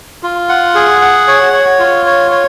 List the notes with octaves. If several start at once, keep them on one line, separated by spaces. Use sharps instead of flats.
F4
F#5
G#4
F#5
C#5
C#5
F4
C#5
C#5